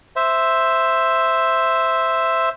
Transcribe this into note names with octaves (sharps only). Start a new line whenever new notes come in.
C5 E5